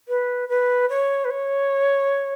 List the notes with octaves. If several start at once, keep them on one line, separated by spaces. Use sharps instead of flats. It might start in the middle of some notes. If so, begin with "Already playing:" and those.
B4
B4
C#5
B4
C#5